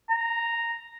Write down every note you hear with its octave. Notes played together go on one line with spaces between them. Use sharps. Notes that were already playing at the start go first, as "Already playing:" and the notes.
A#5